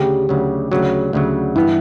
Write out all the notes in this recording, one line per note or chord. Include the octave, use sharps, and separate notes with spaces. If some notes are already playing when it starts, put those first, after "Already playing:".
Already playing: D2 C#3 G4
D2 C#3 F#3
D2 C#3 F#3 F#4
D2 C#3 F#3
G2 E3 B3 E4